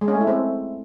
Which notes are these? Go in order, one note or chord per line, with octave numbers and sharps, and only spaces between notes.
G#3
C#4
A3
E4
C4